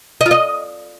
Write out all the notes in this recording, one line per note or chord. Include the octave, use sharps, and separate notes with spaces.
D#5
F4
D#5